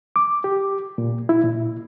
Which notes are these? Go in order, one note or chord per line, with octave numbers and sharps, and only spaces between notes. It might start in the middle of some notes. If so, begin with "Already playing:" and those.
D6
G4
A#2
E4
A#2